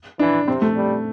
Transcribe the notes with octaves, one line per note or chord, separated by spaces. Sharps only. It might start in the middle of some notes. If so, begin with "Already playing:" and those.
E3 D4
C3 C4
A3
G3